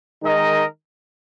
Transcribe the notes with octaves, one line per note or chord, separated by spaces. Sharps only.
D#3 G#3 D#4 A#4 D#5